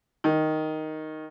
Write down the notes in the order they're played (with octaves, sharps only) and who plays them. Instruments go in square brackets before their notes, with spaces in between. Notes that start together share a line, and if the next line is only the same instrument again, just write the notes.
[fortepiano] D#3